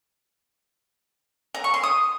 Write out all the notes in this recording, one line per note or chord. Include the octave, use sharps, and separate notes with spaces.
A#5
C#6
C6
D#6